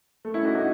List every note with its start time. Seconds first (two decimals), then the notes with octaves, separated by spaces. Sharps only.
0.25 A3
0.34 C#4 E4
0.45 D#4 F#4
0.55 D#4 F#4